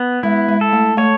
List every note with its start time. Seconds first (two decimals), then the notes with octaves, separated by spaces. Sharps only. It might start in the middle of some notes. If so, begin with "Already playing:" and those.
Already playing: B3
0.23 G#3 E4
0.49 G#3
0.61 A4
0.73 A3
0.97 A3 C#5